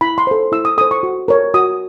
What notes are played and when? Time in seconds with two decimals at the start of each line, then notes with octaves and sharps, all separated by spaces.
0.01 E4 B5
0.18 C6
0.27 A4 C5
0.52 E4 E6
0.65 D#6
0.78 A4 D#6
0.81 C5
0.91 C#6
1.03 F#4
1.28 A#4 C#5
1.54 F#4 D#6